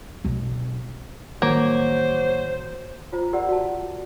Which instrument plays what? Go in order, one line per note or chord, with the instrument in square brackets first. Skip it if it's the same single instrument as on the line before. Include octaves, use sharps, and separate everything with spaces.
[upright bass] B1 C4
[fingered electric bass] A1 D#3 G3 [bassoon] F#3 [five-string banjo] A#3 [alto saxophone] C5
[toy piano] F4 C5 A#5
G4 A#4 D5 F#5
F#4 A5